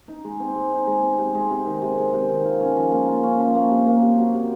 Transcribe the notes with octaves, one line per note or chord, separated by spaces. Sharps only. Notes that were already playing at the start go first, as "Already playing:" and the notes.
D#4
G#3
C4
G#3
D#4
G#3
C4
C3
G#3
C3
D#3
C3
G#3
C3
D#3
F4
C#4
F3
A#3
F4
C#4
F3
A#3
C3
A#3
C3
F#3
C3